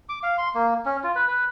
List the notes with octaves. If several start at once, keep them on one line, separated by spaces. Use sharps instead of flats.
D6
F5
C6
A#3
C#4
F4
B4
B4